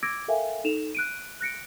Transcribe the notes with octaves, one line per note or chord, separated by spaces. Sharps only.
D6 E6 G#6 A#6 D7
A4 A#4 E5 F5 G5 G#5
D#4 A4 E7 F7
F#6 D7 D#7
F#6 A#6 C#7 D7